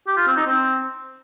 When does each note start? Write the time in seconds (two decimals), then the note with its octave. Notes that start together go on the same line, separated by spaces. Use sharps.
0.07 G4
0.17 F4
0.27 C4
0.37 D#4
0.47 C4